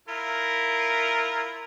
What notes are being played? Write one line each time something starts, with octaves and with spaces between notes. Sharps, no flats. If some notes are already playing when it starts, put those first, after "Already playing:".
E4 F4 A#4